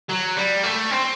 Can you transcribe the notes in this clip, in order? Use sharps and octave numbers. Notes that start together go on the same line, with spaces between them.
F#3
G3
A3
C4